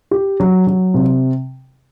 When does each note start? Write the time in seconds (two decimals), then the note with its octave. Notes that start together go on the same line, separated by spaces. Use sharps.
0.11 G4
0.40 F#3
0.67 F#3
0.94 C3